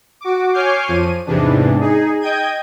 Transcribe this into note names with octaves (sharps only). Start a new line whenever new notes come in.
F#4 D6
C#5 G#5 D6 F6 G6 C7
F2 F3 D#7
E2 G#2 C3 E3 D4
D#4 G#4
D#5 G5 G6 G#6 D#7